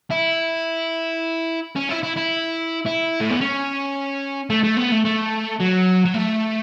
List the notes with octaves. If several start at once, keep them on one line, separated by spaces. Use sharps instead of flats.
E4
C#4
E4
E4
E4
E4
A3
B3
C#4
A3
A3
B3
A3
A3
F#3
F#3
A3